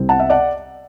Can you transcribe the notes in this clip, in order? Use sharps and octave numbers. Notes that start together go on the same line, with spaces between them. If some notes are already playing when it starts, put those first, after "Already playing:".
Already playing: C2 C3 G3 C4
F#5 A5
E5
D5 F#5